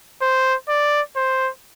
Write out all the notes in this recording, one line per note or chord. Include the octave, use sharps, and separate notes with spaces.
C5
D5
C5